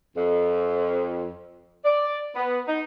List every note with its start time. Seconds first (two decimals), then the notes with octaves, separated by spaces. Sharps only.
0.17 F2
1.84 D5
2.35 B3
2.67 D#4